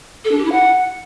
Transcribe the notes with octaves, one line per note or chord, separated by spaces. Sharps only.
A4
D4
G4
E4
F#5